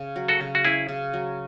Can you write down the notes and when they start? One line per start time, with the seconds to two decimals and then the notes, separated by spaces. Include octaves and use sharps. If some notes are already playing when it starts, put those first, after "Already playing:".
Already playing: C#3
0.16 F#3
0.28 F#4 A4
0.40 C#3
0.55 F#4
0.65 C#4 E4 G#4
0.89 C#3
1.14 F#3